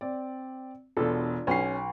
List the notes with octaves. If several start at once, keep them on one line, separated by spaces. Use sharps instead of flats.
C4 D5
E1 B2 D4 F4 A4
B1 C#4 C7